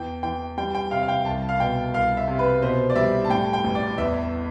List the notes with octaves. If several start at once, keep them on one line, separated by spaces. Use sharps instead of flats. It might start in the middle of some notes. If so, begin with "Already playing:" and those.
Already playing: E2 G5
E3 G5
G3 G5
G5
C3 F5
F5
G5
C2 A5
F5
B2 G5
C2 F5
E5
C3
B4
B2 C5
D5
G3 E5
A5
A2 G5
G5
A1
D5
E2 E5